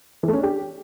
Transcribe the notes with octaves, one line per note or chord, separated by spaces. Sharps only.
E3
A3
C#4
D4
G4